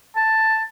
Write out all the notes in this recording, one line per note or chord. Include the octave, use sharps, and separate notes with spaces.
A5